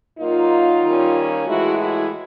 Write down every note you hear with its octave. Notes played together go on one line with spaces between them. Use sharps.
A#2 F#3 A#3 D#4 F4
D#3 G3 A#3 C#4
A2 E3 G#3 E4 F#4
E4 F#4